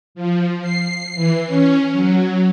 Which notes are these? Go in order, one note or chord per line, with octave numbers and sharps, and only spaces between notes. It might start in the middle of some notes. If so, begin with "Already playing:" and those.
F3
C7
E3
C#4
F#3